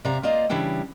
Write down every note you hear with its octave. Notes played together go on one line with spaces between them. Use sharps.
C3 D5 E5 F5 A#5
A#3 F4 C5 D5 D#5 A#5
C#3 E3 G3 D4 E4 G5